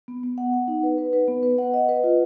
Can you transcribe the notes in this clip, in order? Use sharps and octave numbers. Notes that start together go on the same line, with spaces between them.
B3
B3
F#5
F#5
D#4
B4
B4
B4
B3
B4
F#5
D#5
B4
F4